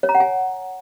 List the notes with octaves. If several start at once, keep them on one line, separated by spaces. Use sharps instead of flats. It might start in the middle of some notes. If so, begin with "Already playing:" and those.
C#5
A#5
F#5
G#5